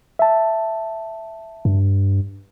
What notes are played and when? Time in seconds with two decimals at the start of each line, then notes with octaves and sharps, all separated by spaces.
0.19 E5 A5
1.65 G2